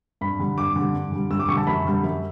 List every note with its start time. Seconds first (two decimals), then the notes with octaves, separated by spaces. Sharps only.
0.21 G2 B5
0.39 D3 G3
0.58 G2 D6
0.76 D3 G3
0.94 G2
1.12 D3 G3
1.30 G2 E6
1.40 D6
1.48 D3 G3 C#6
1.57 A5
1.67 F#2 B5
1.85 D3 G3
2.03 F#2